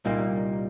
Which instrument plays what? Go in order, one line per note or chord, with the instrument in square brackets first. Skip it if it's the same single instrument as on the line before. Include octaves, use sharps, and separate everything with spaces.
[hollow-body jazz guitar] C2 A#2 G3 A#3 [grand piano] D#4